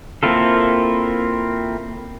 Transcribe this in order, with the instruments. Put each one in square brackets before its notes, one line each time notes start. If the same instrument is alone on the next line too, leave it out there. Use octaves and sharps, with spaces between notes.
[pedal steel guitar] A#3 C4 E4 F4 A4